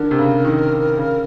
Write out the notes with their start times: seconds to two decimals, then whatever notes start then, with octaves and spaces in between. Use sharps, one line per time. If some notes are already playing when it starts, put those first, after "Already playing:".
Already playing: D3 A#4
0.11 C3
0.18 C#3
0.45 D#3
0.97 C#3